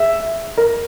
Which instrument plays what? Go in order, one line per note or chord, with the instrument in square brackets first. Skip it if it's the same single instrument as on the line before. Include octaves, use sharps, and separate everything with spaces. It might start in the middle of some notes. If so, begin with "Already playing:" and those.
Already playing: [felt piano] G#4 [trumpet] E5
[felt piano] A#4